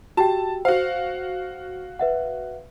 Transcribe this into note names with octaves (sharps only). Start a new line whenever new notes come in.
F#4 G4 G5 A5
F#4 C5 F5
B4 E5 F#5